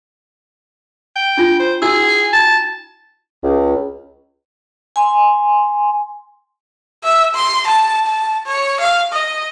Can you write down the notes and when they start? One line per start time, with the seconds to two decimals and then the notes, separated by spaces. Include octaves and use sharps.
1.16 G5
1.37 D4 F4
1.60 C5
1.82 E4 F#4 G#4 E6
2.33 A5
3.43 C#2
4.96 G#5 C6
7.04 E5
7.34 C6
7.67 A5
8.06 A5
8.46 C#5
8.81 F5
9.13 D#5